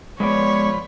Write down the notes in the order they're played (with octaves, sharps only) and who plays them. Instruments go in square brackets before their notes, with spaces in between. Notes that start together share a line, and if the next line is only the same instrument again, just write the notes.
[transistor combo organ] F3 B5 [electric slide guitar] G#3 B3 D5 [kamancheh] C#5